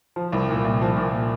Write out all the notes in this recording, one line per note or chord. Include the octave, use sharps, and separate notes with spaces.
F3
C2
A#2
C2
F3
A#2